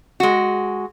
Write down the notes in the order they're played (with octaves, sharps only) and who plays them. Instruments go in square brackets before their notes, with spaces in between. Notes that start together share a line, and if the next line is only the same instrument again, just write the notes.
[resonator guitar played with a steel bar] G#3 F#4